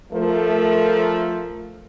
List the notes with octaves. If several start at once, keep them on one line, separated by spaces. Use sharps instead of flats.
F3 A3 A#4